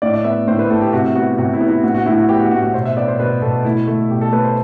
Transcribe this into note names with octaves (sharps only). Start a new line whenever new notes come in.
A2 D5
D5
B3 E5
A2 C5
B4
A2 A4
G4
C3 F#4
B3 F#4
C3 F#4
E4
B3
E4
A2 F#4
F#4
A2 E4
F#4
B3 G4
F#4
A2 F#4
F#4
B2 C5
E5
B3 D5
C5
B2 B4
B2 A4
A3 E4
A3
B2 G4
A4
A3 B4
C5